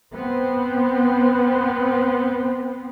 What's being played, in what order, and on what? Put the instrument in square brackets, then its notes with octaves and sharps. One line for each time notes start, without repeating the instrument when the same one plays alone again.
[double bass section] B3 C4